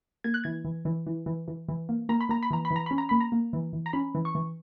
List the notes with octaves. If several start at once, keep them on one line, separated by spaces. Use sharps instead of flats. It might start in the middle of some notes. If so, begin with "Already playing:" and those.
A#3 G#6
F#6
E3 G#6
E3
E3
E3
E3
E3
E3
A#3
A#3 A#5
B5
A#3 A#5
B5
E3 A#5
B5
E3
A#5
C#4 B5
A#5
A#3 B5
A#5
A#3
E3
E3
A#5
C#4 B5
E3
C#6
E3